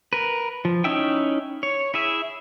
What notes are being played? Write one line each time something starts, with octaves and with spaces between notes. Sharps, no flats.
A#4 B4
F3
C#4 D#4 E4 E5 G5
C#5
E4 G#4 E5